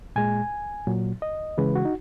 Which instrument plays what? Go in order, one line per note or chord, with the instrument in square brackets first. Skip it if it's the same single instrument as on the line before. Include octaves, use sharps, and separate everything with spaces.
[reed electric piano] A#2 G#3 G#5
A#2 F#3
D#5
C#3 E3 G#3 B4
F#4
D#4